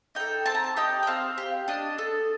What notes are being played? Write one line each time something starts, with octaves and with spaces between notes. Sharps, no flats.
D#4 A4 G5
C4 A5
A#5
A5
D#4 G4 G5
G5
C4 F5
G4
D4 D#5
A4